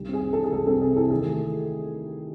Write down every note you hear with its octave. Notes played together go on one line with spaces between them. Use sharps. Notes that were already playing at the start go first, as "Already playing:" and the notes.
Already playing: C2 D#3
C4 G#4
C3
A4
E3
G#4
C2 A4
C4 A4
C3 G#4
E3 A4
D#2 G#4
A3